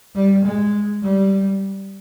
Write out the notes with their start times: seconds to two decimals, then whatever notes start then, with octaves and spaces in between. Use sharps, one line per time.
0.15 G3
0.44 G#3
1.02 G3